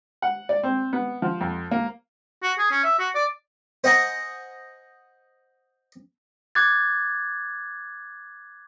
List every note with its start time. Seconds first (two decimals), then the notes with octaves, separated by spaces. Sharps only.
0.22 F#5
0.49 D5
0.63 C4
0.93 B3
1.22 F3
1.41 F2
1.71 A#3
2.42 F#4
2.58 G#4
2.71 C#4
2.84 E5
2.99 F#4
3.15 D5
3.84 C5 D#5 F#5 G#5 A#5
6.55 D6 F#6 G#6 A6